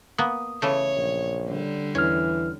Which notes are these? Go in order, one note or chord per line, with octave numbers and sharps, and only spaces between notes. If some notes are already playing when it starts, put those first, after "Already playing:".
A#3 B3 D#6
C#3 E3 A3 C#5
A#1
D3 G3
E2 E3 C#4 F6